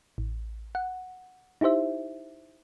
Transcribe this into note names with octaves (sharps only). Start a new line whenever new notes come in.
A1
F#5
D#4 E4 G4 C5 E5